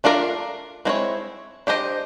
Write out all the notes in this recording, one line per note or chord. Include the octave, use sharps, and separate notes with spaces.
A3 D4 F4 A#4 D5
G#3 C4 E4 G#4 C#5
D4 G4 C5 D#5